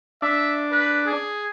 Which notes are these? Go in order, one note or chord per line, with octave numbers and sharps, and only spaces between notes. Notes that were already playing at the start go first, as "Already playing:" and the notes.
D4 E5
B4
G#4